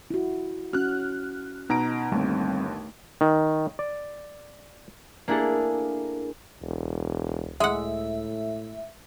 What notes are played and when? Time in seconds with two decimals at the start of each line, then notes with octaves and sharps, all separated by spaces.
0.10 E4 F#4
0.73 C#4 F#4 F6 F#6
1.70 B2 D#4 A#5 D7
2.12 G1 D#2 G3 A3 C4
3.21 D#3
3.79 D5
5.28 A#3 D4 E4 G#4 A4
6.61 E1 C#2
7.60 A2 G#3 E5 F#5